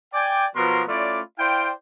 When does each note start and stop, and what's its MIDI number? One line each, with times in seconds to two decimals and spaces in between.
0.13 0.45 74
0.13 0.45 79
0.13 0.45 80
0.55 0.82 47
0.55 0.82 53
0.55 0.82 54
0.55 0.82 59
0.55 0.82 70
0.55 0.82 84
0.88 1.20 57
0.88 1.20 61
0.88 1.20 64
0.88 1.20 65
0.88 1.20 74
1.38 1.71 64
1.38 1.71 72
1.38 1.71 74
1.38 1.71 77
1.38 1.71 79